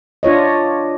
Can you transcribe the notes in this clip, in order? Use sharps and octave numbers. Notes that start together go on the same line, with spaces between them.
D4 F4 C#5 D#5